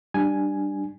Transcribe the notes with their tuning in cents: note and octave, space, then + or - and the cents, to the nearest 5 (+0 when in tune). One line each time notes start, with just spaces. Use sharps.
G3 +0 D4 +10 G#5 +0